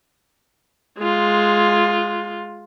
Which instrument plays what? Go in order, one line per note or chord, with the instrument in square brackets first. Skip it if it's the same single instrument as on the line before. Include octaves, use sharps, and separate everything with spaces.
[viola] G#3 F4